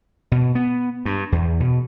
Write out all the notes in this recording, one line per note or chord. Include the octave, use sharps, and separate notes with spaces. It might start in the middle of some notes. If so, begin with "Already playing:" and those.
B2
B3
G2
E2
B2